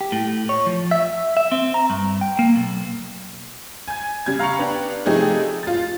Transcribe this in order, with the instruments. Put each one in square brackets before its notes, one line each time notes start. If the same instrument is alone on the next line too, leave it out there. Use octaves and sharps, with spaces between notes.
[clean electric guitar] G4
A2
C#5
F3
E5
E5
C4
A#5
G2
G5
A#3
B1
[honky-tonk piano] G#5 G#6
C#3 G3 G#6
F5 A#5 B5 C#6 C#7 F7
B3 D4 G4
C3 F3 A3 D#4 G4 G#4
F4 A6